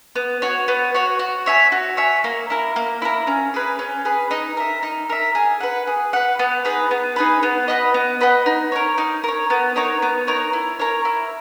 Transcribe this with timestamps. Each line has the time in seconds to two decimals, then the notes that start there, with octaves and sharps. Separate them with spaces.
0.16 B3
0.42 F#4 C#5
0.68 B3
0.95 F#4 C#5
1.19 F#4
1.46 C#5 E5 G#5
1.72 F#4
1.97 C#5 E5 G#5
2.24 A#3
2.50 E4 A#4
2.76 A#3
3.02 E4 A#4
3.27 C#4
3.54 G#4 B4
3.79 C#4
4.05 G#4 B4
4.31 D#4
4.57 A#4 E5
4.83 D#4
5.10 A#4 E5
5.35 G#4
5.61 B4 F#5
5.87 G#4
6.13 B4 F#5
6.39 B3
6.65 D#4 G#4 B4
6.91 B3
7.16 D#4 G#4 B4
7.43 B3
7.68 F#4 B4 D#5
7.94 B3
8.21 F#4 B4 D#5
8.46 D#4
8.72 A#4 C#5
8.98 D#4
9.24 A#4 C#5
9.50 B3
9.76 D#4 A#4 C#5
10.02 B3
10.27 D#4 A#4 C#5
10.53 E4
10.79 A#4 C#5
11.05 E4